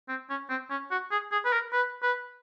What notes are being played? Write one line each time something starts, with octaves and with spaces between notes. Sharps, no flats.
C4
C#4
C4
C#4
F#4
G#4
G#4
B4
A#4
B4
B4